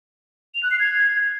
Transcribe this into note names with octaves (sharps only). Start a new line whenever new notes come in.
F7
F#6
C7
G#6